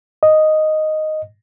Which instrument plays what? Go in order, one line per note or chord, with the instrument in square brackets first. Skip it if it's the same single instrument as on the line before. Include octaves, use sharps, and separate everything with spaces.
[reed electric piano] D#5